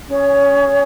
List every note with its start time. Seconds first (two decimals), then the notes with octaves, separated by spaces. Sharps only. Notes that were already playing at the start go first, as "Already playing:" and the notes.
0.06 C#4 G#4 C#5